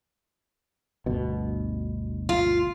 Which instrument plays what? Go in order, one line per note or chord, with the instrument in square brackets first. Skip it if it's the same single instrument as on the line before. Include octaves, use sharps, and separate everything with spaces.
[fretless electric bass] G1 D2 B2
[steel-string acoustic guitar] F4